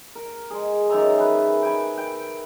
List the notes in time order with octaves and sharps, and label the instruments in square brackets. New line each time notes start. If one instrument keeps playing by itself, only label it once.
[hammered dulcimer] A#4
G#3 G#4
F#2 D#3 E5 A#5
G#4 B4
G5 G#5 B5
G5